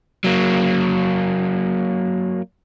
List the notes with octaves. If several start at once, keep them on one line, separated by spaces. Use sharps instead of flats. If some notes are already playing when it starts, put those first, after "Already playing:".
F#3 A#3